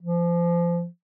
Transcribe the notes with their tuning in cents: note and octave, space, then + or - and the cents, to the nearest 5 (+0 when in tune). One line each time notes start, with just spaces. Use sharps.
F3 -25